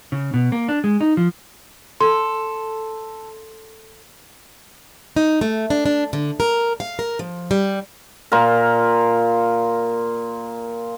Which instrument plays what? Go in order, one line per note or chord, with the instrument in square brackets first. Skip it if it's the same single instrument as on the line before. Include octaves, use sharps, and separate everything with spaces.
[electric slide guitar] C#3
B2
A#3
D4
G#3
D#4
F3
[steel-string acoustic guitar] A4 [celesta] C6
[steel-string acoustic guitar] D#4
A3
D4
D4
D3
A#4
F5
A#4
F3
G3
[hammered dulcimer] A#2 F4 A#4